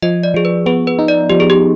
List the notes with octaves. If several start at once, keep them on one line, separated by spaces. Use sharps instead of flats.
F3 D#5
D5
F3 G#4
B4
B3 G#4
B4
D#4
D5
F3 G4
G#4
G4